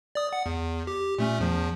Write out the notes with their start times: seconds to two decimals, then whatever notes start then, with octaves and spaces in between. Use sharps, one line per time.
0.15 D5 D#6
0.33 F#5
0.46 E2
0.87 G4
1.19 A#2 A3 C#4
1.40 E2 F3